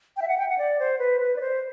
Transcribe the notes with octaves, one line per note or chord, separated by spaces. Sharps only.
G5
E5
F#5
G5
F#5
D5
C5
B4
B4
D5
C5